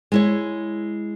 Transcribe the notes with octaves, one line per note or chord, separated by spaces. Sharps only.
G#3 E4 C#5